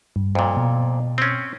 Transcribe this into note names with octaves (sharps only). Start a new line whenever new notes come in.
G2
F2 A#2
B2
C4 C#4